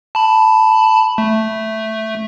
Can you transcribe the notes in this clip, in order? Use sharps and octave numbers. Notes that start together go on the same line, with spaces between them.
A5 B5
A3